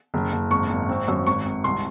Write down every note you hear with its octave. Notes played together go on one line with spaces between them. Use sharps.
F#1
F#1
G#1 C#6
G#1
C4
F#2
G#1 C#6
G#1
C2 C6